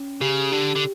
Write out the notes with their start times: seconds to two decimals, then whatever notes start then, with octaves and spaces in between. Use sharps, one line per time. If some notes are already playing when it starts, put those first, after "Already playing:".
Already playing: C#4
0.21 C#3 G4
0.52 D3 G4
0.76 D3